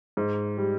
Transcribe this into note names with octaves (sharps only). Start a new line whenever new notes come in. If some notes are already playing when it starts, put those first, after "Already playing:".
G#2
G3